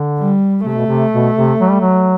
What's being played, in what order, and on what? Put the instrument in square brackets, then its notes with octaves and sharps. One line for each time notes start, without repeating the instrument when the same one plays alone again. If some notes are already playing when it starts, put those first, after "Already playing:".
Already playing: [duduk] D3
[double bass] G3
[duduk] C3 [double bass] A3
[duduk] B2
C3
B2
C3
F#3
G3
F#3